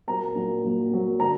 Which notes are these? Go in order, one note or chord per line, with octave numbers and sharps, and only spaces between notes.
A#2 F#3 A#3 A#5
A#2 F#3 A#3
A#2 F#3 A#3
A#2 F#3 A#3
D3 F#3 D4 A#5